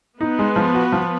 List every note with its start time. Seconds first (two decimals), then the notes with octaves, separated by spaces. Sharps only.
0.21 B3 D#4 B4
0.39 G#3
0.56 F3
0.74 F#4
0.92 F3